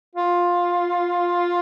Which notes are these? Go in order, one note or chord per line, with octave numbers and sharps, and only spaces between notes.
F4